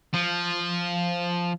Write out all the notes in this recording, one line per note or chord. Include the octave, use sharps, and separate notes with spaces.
F3